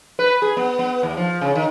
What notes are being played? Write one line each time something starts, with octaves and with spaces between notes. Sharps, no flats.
B4
G#4
B3
B3
D#2
F3
C#3
D#3